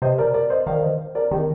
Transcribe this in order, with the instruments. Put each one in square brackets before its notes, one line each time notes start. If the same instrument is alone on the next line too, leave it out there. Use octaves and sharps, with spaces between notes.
[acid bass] C3 [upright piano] C5 D#5
[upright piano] A#4 D5
A#4 D5
C5 D#5
[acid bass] D#3 [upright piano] D5 F5
[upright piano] C5 D#5
A#4 D5
[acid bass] D#3 [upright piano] D#4 G4